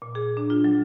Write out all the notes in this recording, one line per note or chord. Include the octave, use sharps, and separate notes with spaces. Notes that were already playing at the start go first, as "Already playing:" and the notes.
A#2
G#4
D4
F4
F#3